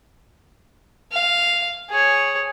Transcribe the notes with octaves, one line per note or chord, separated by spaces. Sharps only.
F5
G#4 C#5